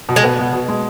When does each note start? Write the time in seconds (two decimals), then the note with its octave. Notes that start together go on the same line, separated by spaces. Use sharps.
0.09 B2
0.16 G#3
0.24 B3
0.39 B2
0.53 B2
0.68 G#3